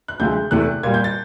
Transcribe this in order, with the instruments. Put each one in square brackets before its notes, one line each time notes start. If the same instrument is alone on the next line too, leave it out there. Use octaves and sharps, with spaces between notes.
[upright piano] F#6
D2 C3 F3 G#3 G6
E2 C3 E3 A3 F#6
A#2 G#6
G3
G6
A6